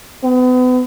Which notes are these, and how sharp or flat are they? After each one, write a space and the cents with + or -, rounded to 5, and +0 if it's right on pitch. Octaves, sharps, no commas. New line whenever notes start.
B3 +35